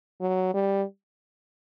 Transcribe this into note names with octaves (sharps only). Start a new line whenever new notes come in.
F#3
G3